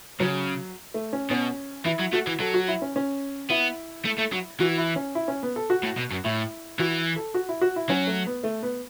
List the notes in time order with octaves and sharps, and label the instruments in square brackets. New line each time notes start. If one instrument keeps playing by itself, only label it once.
[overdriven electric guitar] C#3 [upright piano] F#3
[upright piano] A3
C#4
[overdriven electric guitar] B2 [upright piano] C#4
[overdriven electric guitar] E3 [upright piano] E4
[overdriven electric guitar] F#3
[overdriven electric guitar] A3 [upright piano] F#4
[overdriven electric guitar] E3
[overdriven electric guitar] F#3 [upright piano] A4
[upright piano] F#4
E4
C#4
C#4
[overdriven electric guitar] B3 [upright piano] E4
[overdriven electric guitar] A3
A3
F#3
[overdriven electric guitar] E3 [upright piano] F#4
[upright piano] E4
C#4
E4
C#4
B3
A4
F#4
[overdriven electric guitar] A2
B2
F#2
[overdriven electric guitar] A2 [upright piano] E4
[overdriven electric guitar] E3 [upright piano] F#4
[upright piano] A4
F#4
E4
F#4
E4
[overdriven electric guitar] F#3 [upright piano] C#4
[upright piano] A3
B3
A3
B3